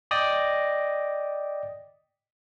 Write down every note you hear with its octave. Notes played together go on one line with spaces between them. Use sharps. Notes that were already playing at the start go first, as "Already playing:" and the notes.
D5 D#5 G5 D#6 A#6